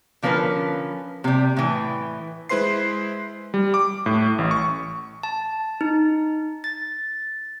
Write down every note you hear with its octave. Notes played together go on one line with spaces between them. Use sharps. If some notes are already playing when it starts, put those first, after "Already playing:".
D3 F3 C#4 A#4 B4
C3 G3
A2 E3
G#3 E4 B4 C5 C6 C7
G3
D6
A2
A1
C#6
A5
D#4
A6